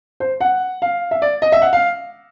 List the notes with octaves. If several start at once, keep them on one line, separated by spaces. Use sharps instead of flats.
C5
F#5
F5
E5
D5
D#5
E5
F#5
F5